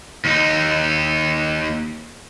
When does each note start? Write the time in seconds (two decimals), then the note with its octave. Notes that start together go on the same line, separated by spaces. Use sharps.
0.25 D#2 D#4